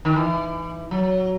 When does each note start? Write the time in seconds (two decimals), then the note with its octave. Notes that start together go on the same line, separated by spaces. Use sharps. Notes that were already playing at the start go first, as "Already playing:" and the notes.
0.05 D#3
0.16 E3
0.91 F#3